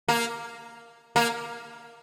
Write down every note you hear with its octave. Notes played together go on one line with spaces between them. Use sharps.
A#3
A#3